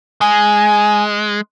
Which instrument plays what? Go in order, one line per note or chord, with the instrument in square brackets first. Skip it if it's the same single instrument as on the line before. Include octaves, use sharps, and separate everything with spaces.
[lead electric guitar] G#3 [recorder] G#5